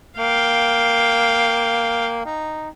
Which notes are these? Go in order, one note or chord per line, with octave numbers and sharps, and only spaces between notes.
A#3 F5 G5
D#4